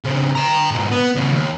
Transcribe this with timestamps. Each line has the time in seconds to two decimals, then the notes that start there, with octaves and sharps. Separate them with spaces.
0.04 C#3 C4
0.35 G5 A#5
0.70 G#2 B2
0.91 B3
1.15 E2 C#3
1.32 D#2